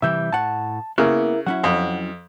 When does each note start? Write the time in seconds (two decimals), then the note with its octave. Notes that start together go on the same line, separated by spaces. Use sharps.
0.02 C3 E3 G3 E5 G6
0.33 A2 F#5 A5
0.98 C#3 A#3 B3 E4 A#4 E5
1.46 F#3 C#4 E4 F#5
1.63 F2